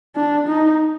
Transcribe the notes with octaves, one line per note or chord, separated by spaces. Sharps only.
D4
D#4